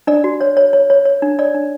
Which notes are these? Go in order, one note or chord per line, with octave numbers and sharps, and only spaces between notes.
D4 D5
F#4
C#5
C#5
C#5
C#5
C#5
D4
C#5 D5
D4